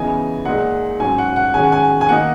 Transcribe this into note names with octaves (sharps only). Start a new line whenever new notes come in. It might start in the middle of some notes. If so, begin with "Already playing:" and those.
Already playing: C#3 E3 B3 D#4 G#5
A#2 G#3 D#4 F#5
G#2 F#3 C#4 G#5
F#5
F#5
D#3 G#3 C#4 G#5
F#5
G#5
G#5
D#3 A#3 D#4 F#5